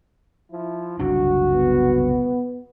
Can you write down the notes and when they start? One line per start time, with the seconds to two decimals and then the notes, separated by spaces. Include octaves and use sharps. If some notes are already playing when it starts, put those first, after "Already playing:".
0.51 F3 E4
0.99 F#1 C2 D4 F#4
1.53 B3